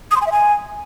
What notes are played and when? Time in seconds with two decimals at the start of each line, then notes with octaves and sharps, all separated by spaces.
0.11 D#6
0.16 C6
0.21 G#5
0.26 E5
0.32 G#5